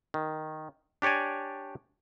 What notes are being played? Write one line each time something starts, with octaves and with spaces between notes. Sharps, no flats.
D#3
D4 G4 C#5 D5 G#5